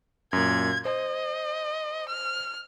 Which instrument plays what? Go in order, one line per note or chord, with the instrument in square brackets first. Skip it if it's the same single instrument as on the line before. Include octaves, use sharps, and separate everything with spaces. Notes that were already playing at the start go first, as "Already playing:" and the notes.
[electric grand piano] F#2 A#2 [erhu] G#6
[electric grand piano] C5 [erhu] D#5
[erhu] F6